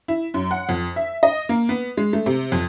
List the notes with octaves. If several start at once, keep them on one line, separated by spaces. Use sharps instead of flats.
E4
F#2
F#5
F2
E5
D#5
A#3
B3
G#3
A3
C3
F2